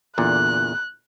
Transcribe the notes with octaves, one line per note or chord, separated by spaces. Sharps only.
E2 A#2 D3 F#6